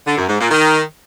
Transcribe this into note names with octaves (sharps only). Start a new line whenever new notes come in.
D3
F#2
G#2
A#2
D#3